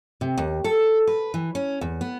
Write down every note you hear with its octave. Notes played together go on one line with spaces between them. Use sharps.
C3
D#2
A4
B4
E3
C#4
E2
B3